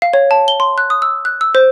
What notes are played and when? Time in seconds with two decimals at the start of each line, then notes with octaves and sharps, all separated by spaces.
0.02 F5
0.13 C#5
0.31 A5
0.48 G7
0.60 C6
0.78 F#6
0.90 D#6
1.02 E6
1.25 F#6
1.41 E6
1.55 C5